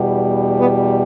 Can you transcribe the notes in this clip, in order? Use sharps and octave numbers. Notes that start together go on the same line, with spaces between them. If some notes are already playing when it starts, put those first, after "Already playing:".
Already playing: E2 B2 G3
B3